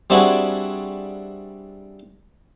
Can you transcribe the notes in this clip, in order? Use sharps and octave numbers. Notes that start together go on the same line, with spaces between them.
G3 C4 D4 E4 F#4 G#4